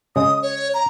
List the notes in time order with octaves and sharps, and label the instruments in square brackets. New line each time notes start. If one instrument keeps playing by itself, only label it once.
[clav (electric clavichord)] C#3 G#3 [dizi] D#6
[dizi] C#5
A#5